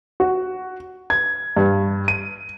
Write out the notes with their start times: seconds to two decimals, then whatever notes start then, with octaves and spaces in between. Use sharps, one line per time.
0.20 F#4
1.10 G#6
1.57 G2
2.08 D#7